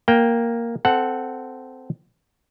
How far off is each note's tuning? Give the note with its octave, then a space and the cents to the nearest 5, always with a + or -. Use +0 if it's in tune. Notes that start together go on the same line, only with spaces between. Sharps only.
A#3 +0 G5 +0
C4 -15 A4 +0 F#5 +0